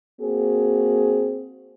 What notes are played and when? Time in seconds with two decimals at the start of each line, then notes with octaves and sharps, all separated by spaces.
0.21 A#3 C4 F#4 G#4